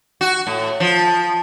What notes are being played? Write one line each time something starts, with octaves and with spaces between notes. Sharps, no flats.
F#4
A2
F3